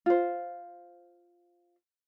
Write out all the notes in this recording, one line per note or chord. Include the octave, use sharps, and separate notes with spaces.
F4 C5